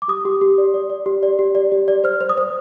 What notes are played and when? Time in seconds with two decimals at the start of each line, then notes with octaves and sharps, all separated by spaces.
0.02 D6
0.08 G4 D#6
0.25 G4
0.41 G4
0.58 D5
0.74 D5
0.90 D5
1.06 G4
1.23 D5
1.39 G4
1.55 D5
1.72 G4
1.88 D5
2.04 C5 F6
2.21 C5
2.29 D#6
2.38 C5